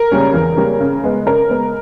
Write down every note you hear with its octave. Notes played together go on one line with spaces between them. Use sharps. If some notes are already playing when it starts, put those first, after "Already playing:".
Already playing: A#4
C#3 G3 A#3 C#4
E2
C#3 G3 A#3 C#4
C#3
G#3 B3
C#3 A#4
G#3 B3